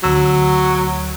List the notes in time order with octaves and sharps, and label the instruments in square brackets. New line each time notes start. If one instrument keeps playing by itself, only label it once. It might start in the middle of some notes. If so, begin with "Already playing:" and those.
[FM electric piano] D2 E6 [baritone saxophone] F#3